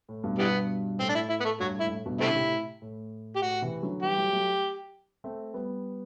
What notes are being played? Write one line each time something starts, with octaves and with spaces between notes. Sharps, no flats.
A2
G2 B2
G2 B2 E3 G3 B3
A2 C4
D4
E4
E4
B3
A3
G2 F#3
A2
E4
G2
A2
G2 B2
C3 A3 C4 E4
D3
A2 C3
A2
G4
A2 F#4
C3 E3
D3 F#3
E3 G3 G4
F#3 A3
F#3 A3
A3 C4
G3 B3